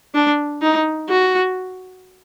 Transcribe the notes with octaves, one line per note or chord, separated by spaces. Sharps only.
D4
D#4
F#4